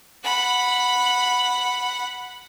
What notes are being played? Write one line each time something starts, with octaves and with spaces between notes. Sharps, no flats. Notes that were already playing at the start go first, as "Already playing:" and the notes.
F#5 B5